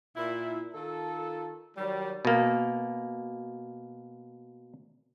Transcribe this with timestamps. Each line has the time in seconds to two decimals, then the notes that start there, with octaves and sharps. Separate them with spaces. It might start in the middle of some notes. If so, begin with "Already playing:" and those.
0.16 A#2 E4
0.73 D#3 F4 A4
1.77 D#3 F#3 G3
2.25 B2 A#3